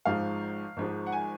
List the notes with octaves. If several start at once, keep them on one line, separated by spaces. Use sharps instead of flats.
G#1 G#2 F3 F5
G#1 G#2 F3
F#5
G#5